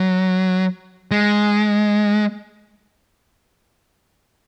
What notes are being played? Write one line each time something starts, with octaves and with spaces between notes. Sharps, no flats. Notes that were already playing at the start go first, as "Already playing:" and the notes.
Already playing: F#3
G#3